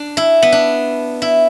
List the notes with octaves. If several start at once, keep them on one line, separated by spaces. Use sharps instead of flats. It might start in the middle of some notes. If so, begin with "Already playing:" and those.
Already playing: D4
E4
B3
D4
E4